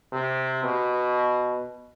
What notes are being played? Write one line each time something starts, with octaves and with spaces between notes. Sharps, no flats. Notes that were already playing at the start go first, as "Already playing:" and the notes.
C3
B2